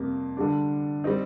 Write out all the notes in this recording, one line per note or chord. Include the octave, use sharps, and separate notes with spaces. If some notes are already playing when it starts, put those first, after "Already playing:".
Already playing: F2 C3 G3 A#3
D3 G3 D4
G3 C4 D#4